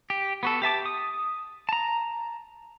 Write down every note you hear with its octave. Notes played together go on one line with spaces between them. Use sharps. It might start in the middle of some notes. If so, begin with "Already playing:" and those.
G4
B3 F#4 A4
G4 E5 A5 D6
D#6
A5 A#5